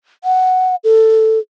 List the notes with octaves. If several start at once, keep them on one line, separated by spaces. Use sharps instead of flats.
F#5
A4